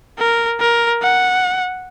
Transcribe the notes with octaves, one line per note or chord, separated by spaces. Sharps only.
A#4
A#4
F#5